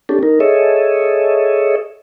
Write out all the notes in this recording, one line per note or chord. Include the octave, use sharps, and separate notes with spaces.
C#4 D4 G4 A4
D#4 A#4
G#4 A4 C#5 D#5 E5